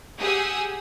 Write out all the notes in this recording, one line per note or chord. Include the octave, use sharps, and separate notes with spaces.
G4 G#4 F#5 G#5 D#6 E6